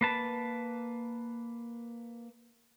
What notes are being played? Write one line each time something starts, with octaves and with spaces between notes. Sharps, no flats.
A#3 B4 A5